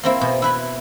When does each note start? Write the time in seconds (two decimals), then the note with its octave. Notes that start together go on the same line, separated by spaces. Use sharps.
0.03 A#3 C4 E4
0.21 B2
0.42 E4 B4 B5